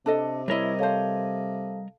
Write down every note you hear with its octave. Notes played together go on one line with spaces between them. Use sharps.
C3 D4 A4 D#5
G3 E4 A#4 C#5 D#5
A4 C5 C#5 F5 A5